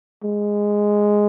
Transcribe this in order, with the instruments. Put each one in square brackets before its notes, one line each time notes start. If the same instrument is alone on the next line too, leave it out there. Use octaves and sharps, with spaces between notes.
[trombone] G#3